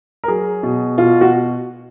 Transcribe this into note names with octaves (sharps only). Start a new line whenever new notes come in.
A#4
F#3 G#4
B2
B2 F4
F#4